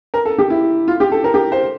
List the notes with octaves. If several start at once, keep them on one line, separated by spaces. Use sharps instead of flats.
A#4
A4
G4
E4
F4
G4
A4
A#4
G4
C5